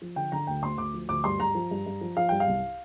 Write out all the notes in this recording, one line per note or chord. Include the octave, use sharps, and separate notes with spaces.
F3
D3 G5
D3 A#5
D2 G5
D2 C6
D2 D6
F3
D2 D6
G2 C6
G2 A#5
F3
G2
G2
F3
F3 F5
G2 G5
F5
C2